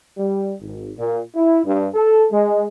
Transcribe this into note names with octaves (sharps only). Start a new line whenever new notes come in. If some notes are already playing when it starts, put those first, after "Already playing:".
G3
G#1
A#2
E4
G2
A4
G#3